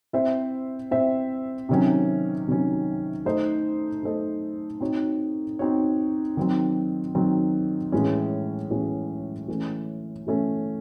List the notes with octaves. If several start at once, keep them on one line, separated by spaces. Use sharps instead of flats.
C4 E4 C5 E5
C4 E4 C5 E5
C3 D#3 F#3 C#4
C3 D#3 F#3 C#4
A3 D#4 A4 C5 D#5
A3 D#4 A4 C5 D#5
C4 D#4 F#4 C#5
C4 D#4 F#4 C#5
D#3 F#3 C4
D#3 F#3 C4
A2 E3 G#3 C#4
A2 E3 G#3 C#4
E3 A3 C#4
E3 A3 C#4